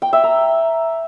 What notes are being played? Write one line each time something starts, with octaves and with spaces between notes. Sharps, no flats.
G5
E5
A#5